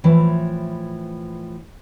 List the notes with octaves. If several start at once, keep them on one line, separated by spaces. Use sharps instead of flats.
A2 E3 F3